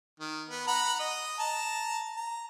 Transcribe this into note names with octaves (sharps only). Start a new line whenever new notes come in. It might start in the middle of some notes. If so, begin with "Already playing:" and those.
D#3
B3
F#5 A#5 B5
D#5
A5 A#5
A#5